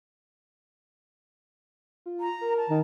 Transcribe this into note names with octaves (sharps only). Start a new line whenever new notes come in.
F4
A#5
A#4
A5
D#3